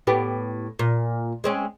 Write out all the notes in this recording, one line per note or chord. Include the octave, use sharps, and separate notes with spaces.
A2 B3 G4
A#2
G#3 C4 C#4